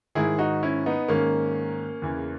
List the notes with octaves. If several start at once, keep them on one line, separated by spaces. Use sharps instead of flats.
G#2 D#3 E4 G#4
D#4 F#4
C#4 E4
B3 D#4
G#2 D#3 A#3 C#4
E2 C#3 E3